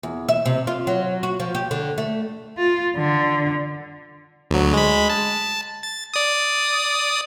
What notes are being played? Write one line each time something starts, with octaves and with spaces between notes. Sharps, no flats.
E2
E5
C3
F4
F#3
F#4
F3
G4
D3
A3
F4
D3
D2 F#3
G#3 B5
A5
A6
D5 D#6